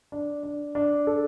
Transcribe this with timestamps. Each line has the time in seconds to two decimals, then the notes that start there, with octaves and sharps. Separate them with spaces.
0.12 D4
0.43 D4
0.75 D4
1.07 A4